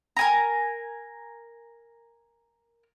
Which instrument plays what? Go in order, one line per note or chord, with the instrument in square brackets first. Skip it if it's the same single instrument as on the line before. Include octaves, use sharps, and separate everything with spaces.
[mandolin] A#4 G#5 A#5